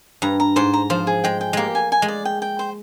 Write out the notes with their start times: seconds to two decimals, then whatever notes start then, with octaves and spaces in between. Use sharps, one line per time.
0.22 G2 A#5
0.40 A#5
0.56 G#2 C5
0.74 A#5
0.90 F3 C5
1.07 G#4
1.24 G#3 G5
1.41 G5
1.53 G#3 A#3 G4
1.75 G#5
1.92 G#5
2.02 G#3
2.08 D5
2.25 G5
2.42 G5
2.59 C5